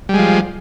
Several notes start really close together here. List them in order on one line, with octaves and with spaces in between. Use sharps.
G3 G#3 F3